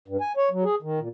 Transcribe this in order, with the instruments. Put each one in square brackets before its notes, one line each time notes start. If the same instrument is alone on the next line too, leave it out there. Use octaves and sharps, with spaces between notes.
[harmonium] G2
G#5
C#5
F#3
G#4
D#3
A#2